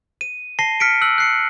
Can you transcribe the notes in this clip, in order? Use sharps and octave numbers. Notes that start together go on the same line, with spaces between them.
D#7
A5 A#6 C7 D#7 G7
F6 B6 C#7 D7
E6 F#6 F#7
F#6 C7 C#7